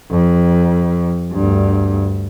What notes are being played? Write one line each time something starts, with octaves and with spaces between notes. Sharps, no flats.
F2
D2 G2